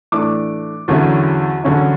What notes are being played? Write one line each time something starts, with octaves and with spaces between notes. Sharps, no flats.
A2 E3 A3 D4 D6
E2 D3 F#3 C#4 E4
E2 D3 F#3 C#4 E4